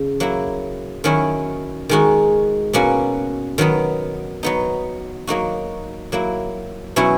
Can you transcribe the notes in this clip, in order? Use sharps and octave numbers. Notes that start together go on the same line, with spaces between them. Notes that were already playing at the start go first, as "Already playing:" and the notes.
Already playing: C#3
F#3 A#3 E4
D#3 F#3 C#4 E4
D#3 G#3 D#4 F#4
B2 A#3 C#4 F#4
D#3 F#3 B3 D#4
F#3 B3 D#4
F#3 A#3 D#4 F#4
F#3 A#3 E4
B2 F#3 C#4 E4